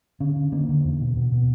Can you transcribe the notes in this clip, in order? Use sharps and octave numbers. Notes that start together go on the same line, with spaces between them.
D3 C#4
D3
D3 A#3
D3
E2
B2
B2
B2